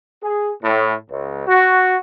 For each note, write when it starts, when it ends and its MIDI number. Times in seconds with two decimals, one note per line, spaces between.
0.23 0.51 68
0.63 0.94 45
1.09 1.43 37
1.47 1.96 66